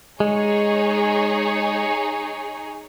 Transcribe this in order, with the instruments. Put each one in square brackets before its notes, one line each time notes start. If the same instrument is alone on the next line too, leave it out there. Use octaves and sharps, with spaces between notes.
[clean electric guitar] G#3 [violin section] D#4 G#4 C#5